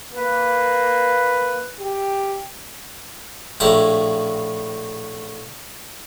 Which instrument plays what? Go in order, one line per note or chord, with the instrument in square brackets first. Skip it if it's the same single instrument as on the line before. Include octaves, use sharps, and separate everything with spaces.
[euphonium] A#3 [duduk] B4
[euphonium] G4
[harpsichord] A#1 A2 E4 A5 A#5